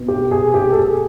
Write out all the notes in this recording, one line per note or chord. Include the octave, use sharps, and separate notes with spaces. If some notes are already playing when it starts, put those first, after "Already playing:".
Already playing: B2
G4
G#4
G4
A4
G#4